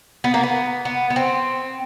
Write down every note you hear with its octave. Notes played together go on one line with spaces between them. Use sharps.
B3
A#3
B3
B3
B3
C4